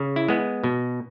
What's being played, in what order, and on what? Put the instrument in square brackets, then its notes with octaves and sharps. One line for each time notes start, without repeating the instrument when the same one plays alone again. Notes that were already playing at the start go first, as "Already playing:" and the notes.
Already playing: [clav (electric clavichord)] C#3
E4
G#3 B3
B2